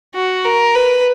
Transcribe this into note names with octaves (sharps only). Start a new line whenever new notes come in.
F#4
A#4
B4